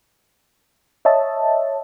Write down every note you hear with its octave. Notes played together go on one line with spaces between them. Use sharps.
C#5 D#5 E5 A5